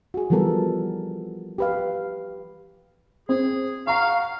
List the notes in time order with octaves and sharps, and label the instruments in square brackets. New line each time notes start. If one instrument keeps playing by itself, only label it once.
[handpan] F#4 G#4
E3 F3 G3 B3 A4 A#4
G4 B4 F5
[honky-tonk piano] C4 [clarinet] G#4
[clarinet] F5 [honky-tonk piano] F#5 A#5 C#6